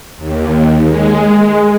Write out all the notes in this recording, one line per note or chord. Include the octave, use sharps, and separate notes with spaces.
D#2
G#3